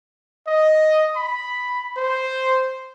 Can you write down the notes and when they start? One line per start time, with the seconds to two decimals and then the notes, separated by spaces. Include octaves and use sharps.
0.47 D#5
1.16 B5
1.97 C5